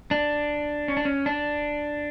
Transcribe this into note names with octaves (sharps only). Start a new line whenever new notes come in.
D4
C#4
D4
C#4
D4